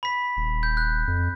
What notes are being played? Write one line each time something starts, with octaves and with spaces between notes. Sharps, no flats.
B5 B6
D#1
G6
F#6
F2